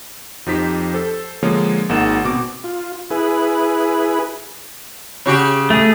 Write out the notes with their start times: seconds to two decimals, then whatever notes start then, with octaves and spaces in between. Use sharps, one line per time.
0.46 F2 F3 D#4 G4 C5 B6
0.94 A4 C5
1.43 D3 F3 G#3 A#3 C#5
1.89 G#1 A#3 D#4 G#4 F#5 E7
2.24 B2 C4 D6
2.64 F4
3.11 E4 G#4 B4
5.26 C#3 F#4 G4
5.70 A3 G#4